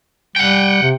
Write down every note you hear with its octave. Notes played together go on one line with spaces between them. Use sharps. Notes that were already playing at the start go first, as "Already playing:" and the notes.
G3 F#5 G5
C3